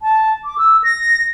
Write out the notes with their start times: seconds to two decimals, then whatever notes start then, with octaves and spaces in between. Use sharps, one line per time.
0.02 A5
0.45 D6
0.58 E6
0.84 A#6